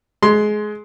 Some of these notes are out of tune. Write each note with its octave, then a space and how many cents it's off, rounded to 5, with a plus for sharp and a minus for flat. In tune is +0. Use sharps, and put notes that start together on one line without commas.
G#3 +25 C6 +0